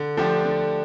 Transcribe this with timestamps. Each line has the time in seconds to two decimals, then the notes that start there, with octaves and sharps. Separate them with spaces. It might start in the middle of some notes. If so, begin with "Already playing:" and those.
Already playing: D3
0.17 F3 A3 D4 G4
0.45 D3